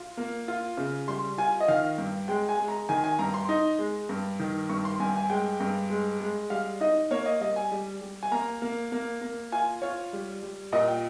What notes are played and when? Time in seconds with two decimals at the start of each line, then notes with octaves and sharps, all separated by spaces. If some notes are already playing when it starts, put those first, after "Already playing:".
Already playing: F4
0.17 A#3
0.48 F4
0.77 C#3
1.08 G3 C6
1.38 F4 G#5
1.60 D#5
1.68 D#3 F5
1.98 G2
2.28 G#3 G5
2.49 G#5
2.59 G#3
2.68 A#5
2.89 D#3 G#5
3.04 G#5
3.19 G2 A#5
3.34 C6
3.49 D#4
3.79 G#3
4.09 G2
4.39 D#3
4.69 G2 C#6
4.85 C6
5.00 G2 G#5
5.15 G#5
5.30 G#3 G5
5.60 G2
5.90 G#3
6.20 G#3
6.50 G3 F5
6.81 D#4 D#5
7.11 A#3 C#5
7.26 D#5
7.41 G3 D#5
7.56 G#5
7.72 G3
8.01 G3
8.23 G#5
8.31 A#3 A#5
8.62 A#3
8.92 A#3
9.21 A#3
9.52 F4 G#5
9.82 F4 C#5
10.13 G3
10.43 G3
10.73 A#2 D#5
10.88 G5